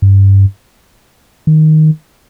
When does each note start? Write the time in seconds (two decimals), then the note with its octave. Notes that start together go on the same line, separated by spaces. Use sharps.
0.02 G2
1.47 D#3